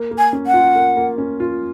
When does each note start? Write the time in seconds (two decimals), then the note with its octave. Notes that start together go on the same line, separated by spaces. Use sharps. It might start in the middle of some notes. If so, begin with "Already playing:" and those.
Already playing: A#3
0.11 A#3
0.18 G#5
0.33 C#4
0.47 F#5
0.54 F4
0.75 A#3
0.97 A#3
1.18 C#4
1.40 F4